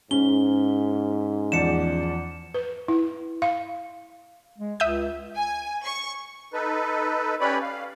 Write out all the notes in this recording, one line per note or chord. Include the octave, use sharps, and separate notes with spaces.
G#2 C#4 G7
E2 F3 D5 C#7 E7
B4
E4
F5
G#3
C#2 E5 D#6 G6
G#5
C#6
D#4 A4 B4
C#4 G4 B4 C#5 D5 B5
F5